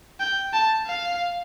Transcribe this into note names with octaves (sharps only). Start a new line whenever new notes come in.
G5
A5
F5